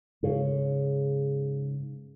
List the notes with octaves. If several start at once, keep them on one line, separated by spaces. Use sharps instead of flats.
G#2 C#3